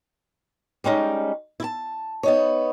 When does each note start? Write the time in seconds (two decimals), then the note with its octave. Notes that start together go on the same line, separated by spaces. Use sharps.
0.84 G3 G#3 C#4 D#4
1.60 E4 A5
2.23 B3 D#4 C#5